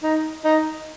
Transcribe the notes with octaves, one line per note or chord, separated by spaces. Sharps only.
D#4
D#4